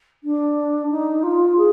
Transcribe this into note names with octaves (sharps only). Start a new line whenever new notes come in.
D4
D#4
F4
G#4